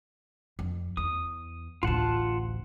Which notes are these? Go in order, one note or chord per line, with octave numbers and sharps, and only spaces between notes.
F2
E2 D#6
A1 D2 F4 F#5 A5